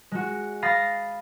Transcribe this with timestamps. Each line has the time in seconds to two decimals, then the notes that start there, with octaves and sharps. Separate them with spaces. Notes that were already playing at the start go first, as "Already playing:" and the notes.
0.12 G#3 F#4
0.62 F5 B5 D#6 A6 A#6 C7